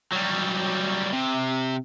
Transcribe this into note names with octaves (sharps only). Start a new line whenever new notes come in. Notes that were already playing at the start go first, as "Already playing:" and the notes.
F#3 G3
C3